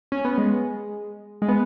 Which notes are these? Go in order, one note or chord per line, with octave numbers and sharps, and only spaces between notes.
C#4
B3
G#3
G#3
B3